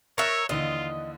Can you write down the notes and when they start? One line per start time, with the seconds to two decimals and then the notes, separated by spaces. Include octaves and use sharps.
0.18 A#4 C#5 E5 C#6 F#6 A6
0.49 D#2 D3 E3 F4 D#5